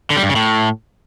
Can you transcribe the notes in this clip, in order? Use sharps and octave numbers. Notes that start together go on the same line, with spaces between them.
D3
G3
G2
C#3
A2